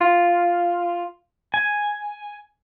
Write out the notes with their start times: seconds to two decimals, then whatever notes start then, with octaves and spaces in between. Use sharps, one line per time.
0.01 F4
1.54 G#5